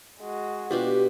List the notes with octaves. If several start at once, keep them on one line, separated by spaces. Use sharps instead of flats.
G#3 F#4
B2 D4 F4 G4